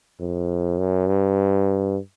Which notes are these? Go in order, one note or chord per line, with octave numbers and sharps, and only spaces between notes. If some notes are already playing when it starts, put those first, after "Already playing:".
F2
F#2
G2